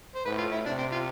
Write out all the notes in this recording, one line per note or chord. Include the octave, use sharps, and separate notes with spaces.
C5
A2 B4
F4
E4
C3 D4
C4
F4